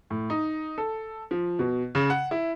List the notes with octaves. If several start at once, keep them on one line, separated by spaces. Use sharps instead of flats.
A2
D#4
A4
F3
B2
C#3
F#5
E4